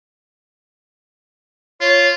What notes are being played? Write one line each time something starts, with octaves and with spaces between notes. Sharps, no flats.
F4 C#5